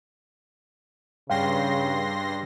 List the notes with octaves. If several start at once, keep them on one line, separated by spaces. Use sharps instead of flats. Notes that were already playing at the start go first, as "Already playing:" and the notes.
G2 C#3 F5 G5 C6 A#6